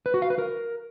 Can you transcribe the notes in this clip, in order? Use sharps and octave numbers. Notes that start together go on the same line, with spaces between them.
B4
F#4
F5
B4
A#4